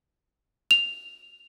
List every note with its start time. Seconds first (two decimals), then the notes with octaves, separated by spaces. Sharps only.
0.71 F7